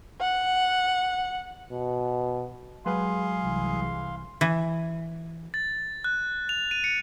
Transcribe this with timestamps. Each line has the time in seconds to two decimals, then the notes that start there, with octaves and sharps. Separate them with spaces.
0.21 F#5
1.72 B2
2.86 F#3 G#3 G#4 B4 F5 C6
3.40 C2 E3
4.41 E3
5.54 A6
6.04 F#6
6.49 F7
6.71 D#7
6.84 C#7